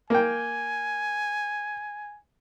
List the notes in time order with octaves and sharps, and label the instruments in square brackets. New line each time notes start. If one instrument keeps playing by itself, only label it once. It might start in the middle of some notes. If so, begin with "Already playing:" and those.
[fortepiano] A#3 G5 [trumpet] G#5